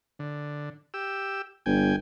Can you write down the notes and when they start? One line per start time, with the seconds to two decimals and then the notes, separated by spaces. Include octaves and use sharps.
0.19 D3
0.94 G4 E6
1.66 G1 G5 G#5